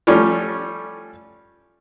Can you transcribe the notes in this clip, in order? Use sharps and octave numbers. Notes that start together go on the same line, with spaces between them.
F3 G3 A3 C#4